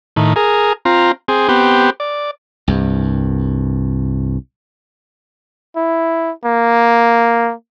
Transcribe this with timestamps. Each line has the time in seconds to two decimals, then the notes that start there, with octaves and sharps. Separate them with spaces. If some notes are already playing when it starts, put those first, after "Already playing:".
0.16 A2 D#3
0.36 G#4 A#4
0.85 C4 F4 A#5
1.28 C4 G#4
1.48 B3 C4 G4
2.00 D5
2.68 C2 G2
5.76 E4
6.45 A#3